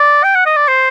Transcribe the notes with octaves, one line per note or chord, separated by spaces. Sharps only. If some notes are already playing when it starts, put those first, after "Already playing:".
Already playing: D5
G5
F#5
D#5
D5
C5